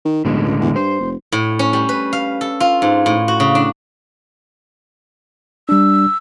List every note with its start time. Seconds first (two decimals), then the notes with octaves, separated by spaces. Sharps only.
0.05 D#3
0.25 B1 A2 D3 G#3
0.45 C#2
0.61 E2
0.76 G2 C5
1.00 F1
1.32 A2
1.59 C#4
1.73 G3
1.89 B4
2.13 F5
2.41 A4
2.60 F4
2.82 G#2
3.06 A2
3.28 F#4
3.40 C#3
3.55 D4
5.69 G3 D4 E6